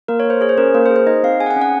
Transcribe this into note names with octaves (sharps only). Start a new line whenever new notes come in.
A#3 A#4
C#5
A#3
C5
G#4 C#5
C5
C#4 A#4
A#3 A#4
C5
G#4
C5
D#4 D#5
C4 F5
G#4 G#5
F#5
G#5
C#4
F#5